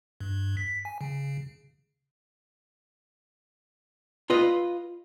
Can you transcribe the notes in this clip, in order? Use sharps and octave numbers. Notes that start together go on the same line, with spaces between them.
G2
B6
G#5
C#3
F4 B4 D#5